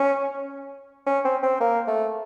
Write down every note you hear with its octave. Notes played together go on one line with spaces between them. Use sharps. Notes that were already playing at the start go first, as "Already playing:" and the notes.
Already playing: C#4
C#4
C4
C4
A#3
A3